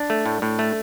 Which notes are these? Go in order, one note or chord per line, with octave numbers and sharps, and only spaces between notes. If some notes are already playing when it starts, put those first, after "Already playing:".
Already playing: D4
A3
A2
A2
A3